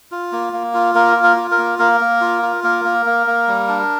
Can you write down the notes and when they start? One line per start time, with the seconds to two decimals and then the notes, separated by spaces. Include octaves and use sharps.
0.11 F4
0.32 A#3
0.53 A#3
0.74 F4
0.95 A#3 A#4
1.16 F4
1.23 A#4
1.37 F4
1.51 A#4
1.58 A#3
1.79 A#3 A#4
2.01 A#3
2.21 F4
2.42 F4
2.63 A#3 A#4
2.85 A#3
3.06 A#3
3.27 A#3
3.48 G3
3.68 D4